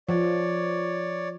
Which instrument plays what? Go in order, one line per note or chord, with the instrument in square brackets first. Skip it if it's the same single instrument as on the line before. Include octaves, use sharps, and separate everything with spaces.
[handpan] F3 [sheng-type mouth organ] C#5 D5